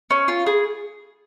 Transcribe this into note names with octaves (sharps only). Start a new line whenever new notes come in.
C#4
F4
G#4